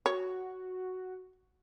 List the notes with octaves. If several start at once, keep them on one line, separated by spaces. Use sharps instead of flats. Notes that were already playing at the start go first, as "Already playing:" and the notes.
F#4 C#5